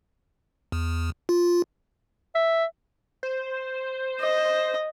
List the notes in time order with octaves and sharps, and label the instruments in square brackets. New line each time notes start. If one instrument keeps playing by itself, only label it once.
[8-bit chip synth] E2
F4
[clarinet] E5
[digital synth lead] C5
[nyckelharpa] D#5